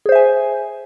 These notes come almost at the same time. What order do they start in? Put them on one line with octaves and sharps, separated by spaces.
G#4 C5 E5 G#5